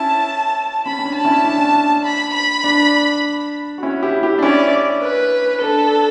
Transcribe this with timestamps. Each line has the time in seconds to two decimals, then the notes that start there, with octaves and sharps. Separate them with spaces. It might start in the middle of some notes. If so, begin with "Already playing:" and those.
Already playing: C#4 E4 A5
0.86 C#4 B5
0.99 C#4
1.05 D4
1.15 A5
1.25 C#4 E4
1.45 D4
1.58 C#4
1.71 D4
2.05 B5
2.34 B5
2.64 D4
3.78 F#4
3.83 C#4 E4
4.03 E4 G4
4.23 E4 G4
4.38 D4
4.43 C#4 E4 D5
5.02 B4
5.61 D4 A4